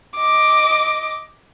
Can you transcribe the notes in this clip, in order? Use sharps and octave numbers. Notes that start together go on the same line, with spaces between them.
D#5 D6